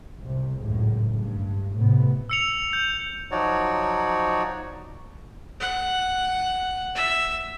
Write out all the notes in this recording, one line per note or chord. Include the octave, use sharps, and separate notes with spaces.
C2 C3
G#1 C#2 F#2 A2
G2
A2 C3 B3
E6 C#7 F7
G6
F3 F#3 D#4 F#4 C#5 D5
F#5
E5